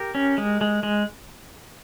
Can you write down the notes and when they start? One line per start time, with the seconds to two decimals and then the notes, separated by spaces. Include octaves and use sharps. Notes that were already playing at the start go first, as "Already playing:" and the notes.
Already playing: G4 A#4
0.15 C#4
0.38 G#3
0.61 G#3
0.83 G#3